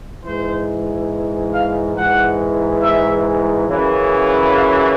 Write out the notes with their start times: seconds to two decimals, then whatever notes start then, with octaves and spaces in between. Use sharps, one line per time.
0.24 G#2 E3 C5
1.53 F5
1.96 G#2 E3 F#5
2.82 E5
3.68 F#2 C#3 E3
4.53 F5